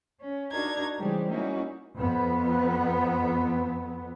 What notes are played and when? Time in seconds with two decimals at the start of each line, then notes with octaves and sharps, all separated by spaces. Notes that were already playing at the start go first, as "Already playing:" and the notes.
0.20 C#4
0.50 D4 D#4 F#4 A#4 A#5 G#6
0.98 C#3 E3 G3 G#3 C4 G4
1.29 G3 A#3 C#4 D#4 E4 F#4
1.98 F2 B3